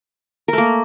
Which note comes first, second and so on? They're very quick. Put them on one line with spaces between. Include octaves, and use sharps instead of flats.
A#4 A3 A#3